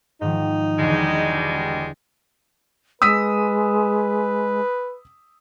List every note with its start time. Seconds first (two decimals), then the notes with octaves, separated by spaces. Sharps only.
0.21 G#2 D#3 F3 D#4
0.78 E1 B2 D3 G3 G#3
3.02 G#3 B4 D#6 E6 B6